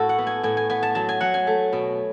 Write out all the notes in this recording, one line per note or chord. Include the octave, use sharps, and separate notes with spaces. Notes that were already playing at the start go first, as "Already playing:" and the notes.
Already playing: A2 F#4 A4
F#5
B3
G#5
A2 G#5
G#5
B3 G#5
A5
F#3 A5
G#5
F#3 F#5
G#5
A3
B2